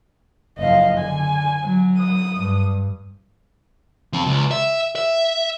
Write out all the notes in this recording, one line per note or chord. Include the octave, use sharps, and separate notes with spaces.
F#1 F3 D#5 F5
D3 G#5
F#3
D#6
G2
F3 C4
C#2
E5
E5